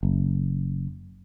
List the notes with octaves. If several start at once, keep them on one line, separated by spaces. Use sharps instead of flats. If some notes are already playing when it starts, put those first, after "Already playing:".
F#1